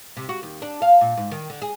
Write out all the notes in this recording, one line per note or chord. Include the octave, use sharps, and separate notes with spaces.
C3
F#4
D#2
D4
F5
A#2
G#2
D#3
D3
G#4